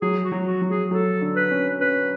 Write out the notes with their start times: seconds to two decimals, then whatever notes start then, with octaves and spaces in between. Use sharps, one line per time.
0.02 F#3 G#4
0.24 F#4
0.32 F#3
0.46 F#4
0.62 F#3
0.69 G#4
0.91 F#3 A4
1.22 D3
1.36 B4
1.51 C#4
1.81 C#4 B4